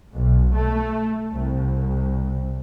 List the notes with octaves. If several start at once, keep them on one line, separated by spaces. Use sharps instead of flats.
B1
A3
C2